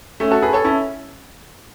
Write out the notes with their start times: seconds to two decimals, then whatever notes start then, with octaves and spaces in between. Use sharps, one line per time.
0.20 A3 C#4
0.31 F#4 A4
0.42 G#4 B4
0.53 A4 C#5
0.64 C#4 E4